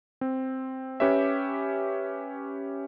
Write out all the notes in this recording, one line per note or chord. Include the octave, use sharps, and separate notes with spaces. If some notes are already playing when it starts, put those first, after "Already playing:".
C4
C#4 G4 B4 C#5 E5